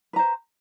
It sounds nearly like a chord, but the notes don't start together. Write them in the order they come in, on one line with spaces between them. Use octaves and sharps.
B4 A#5 C5